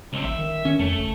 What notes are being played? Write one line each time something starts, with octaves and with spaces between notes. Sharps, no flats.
C#2 C4
A1 E5
D#3
D#3 C#4
F2 A3
F#1